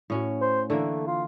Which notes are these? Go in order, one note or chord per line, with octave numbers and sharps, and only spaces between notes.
A2 C#4 F#4
C5
D3 E3 A3 A#3
F4